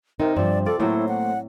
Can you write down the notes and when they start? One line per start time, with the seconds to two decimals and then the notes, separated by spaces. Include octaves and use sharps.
0.20 C3 C4 D#4 A#4
0.37 G2 F3 C4 D5
0.66 F4 A4 D5
0.80 A2 F#3 A3 A#3 E4 C5
1.08 F#5